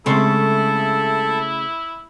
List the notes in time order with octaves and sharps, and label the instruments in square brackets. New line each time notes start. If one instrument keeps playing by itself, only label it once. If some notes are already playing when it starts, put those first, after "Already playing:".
[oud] C#3 A3 [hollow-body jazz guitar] G#3 C4 C6 [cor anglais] E4 [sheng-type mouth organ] A4